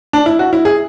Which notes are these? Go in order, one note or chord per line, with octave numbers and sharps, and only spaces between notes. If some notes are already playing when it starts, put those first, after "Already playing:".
D4
E4
F#4
E4
G#4